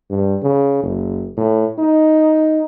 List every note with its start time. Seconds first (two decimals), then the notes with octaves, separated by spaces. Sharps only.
0.10 G2
0.43 C#3
0.83 F#1
1.37 A2
1.79 D#4